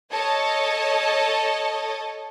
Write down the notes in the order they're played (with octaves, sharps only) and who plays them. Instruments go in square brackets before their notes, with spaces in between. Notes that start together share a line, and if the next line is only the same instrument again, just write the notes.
[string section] A4 C#5 D#5 A5